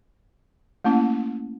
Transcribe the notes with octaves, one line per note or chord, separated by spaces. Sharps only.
A3 A#3 C#4 E4